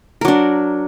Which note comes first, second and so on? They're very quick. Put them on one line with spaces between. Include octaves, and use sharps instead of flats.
A#4 F#3 D4